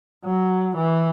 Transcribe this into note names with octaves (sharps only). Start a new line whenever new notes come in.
F#3
E3